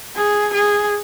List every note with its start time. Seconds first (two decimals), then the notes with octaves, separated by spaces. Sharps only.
0.16 G#4
0.54 G#4